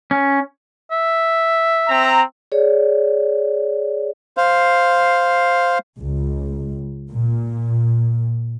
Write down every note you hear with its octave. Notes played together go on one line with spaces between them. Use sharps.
C#4
E5
C4 A#5
G#4 C#5 D5
C5 F5
C#2
A#2